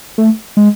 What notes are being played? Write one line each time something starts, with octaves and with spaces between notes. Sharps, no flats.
A3
G#3